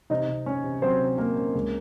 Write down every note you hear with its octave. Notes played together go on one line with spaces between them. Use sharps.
C3 D#4 D#5
C3
C#4 C#5
C3
F#3 C4 C5
C3
A#3 C#4 A#4
C#4
C#2